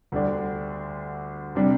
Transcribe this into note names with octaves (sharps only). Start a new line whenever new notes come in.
D2 D3 G3 D4
C3 G3 D4